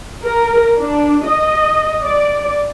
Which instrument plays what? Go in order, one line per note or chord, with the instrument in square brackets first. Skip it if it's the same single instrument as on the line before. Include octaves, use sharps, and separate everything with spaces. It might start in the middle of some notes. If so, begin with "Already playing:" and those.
[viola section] A#4
D4
D#5
D5